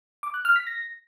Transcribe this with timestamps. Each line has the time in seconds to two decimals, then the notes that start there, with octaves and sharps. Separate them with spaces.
0.23 D6
0.34 F#6
0.45 F6
0.56 B6
0.67 A#6